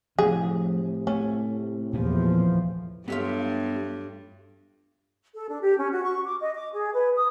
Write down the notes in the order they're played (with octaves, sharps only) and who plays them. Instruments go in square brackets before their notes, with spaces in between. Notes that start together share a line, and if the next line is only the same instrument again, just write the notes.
[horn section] A2 C3 [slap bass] F3 A3 [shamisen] G#4
[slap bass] A3 [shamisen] C#4
[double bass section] E2 F3 [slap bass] A#2 A#3 B3
[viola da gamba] G2 [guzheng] F#3 A3 F4 [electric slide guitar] B3 G4 E5
[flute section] A4
D4
G4
C#4
F#4
C#6
D6
D#5
D6
G#4
B4
D#6